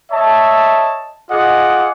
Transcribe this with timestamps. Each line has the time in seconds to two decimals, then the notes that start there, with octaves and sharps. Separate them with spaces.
0.12 C#5 D#5 E5 A5
1.31 F4 G#4 D#5 F#5 D6